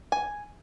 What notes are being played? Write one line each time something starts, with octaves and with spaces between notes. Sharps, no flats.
G#5